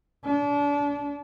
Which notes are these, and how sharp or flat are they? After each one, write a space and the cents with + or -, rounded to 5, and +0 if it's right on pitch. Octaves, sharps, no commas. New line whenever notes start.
D4 -30